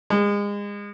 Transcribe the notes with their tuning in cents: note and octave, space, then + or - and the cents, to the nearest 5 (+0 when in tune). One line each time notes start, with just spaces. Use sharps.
G#3 -30